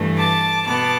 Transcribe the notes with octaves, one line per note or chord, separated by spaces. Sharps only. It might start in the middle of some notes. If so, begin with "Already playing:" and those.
Already playing: G2 E3 A3
A5 D6
B2 B3 A5 D6